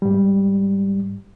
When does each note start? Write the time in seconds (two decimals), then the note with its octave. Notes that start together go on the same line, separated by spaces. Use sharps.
0.02 G#2 G3